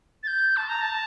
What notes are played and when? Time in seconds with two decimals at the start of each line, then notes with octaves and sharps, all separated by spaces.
0.23 A6
0.27 G6
0.57 A5
0.69 A#5
0.81 A5